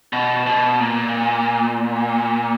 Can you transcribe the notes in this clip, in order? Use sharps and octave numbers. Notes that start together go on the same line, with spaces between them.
B2
B2
A#2